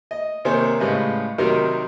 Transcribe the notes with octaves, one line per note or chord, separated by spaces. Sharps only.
D#5
C3 D#3 A#3 C5 C#5 G#5
A2 C#3 G3 G#3 B4 D#5
C3 D#3 F#3 G3 D#4 A#4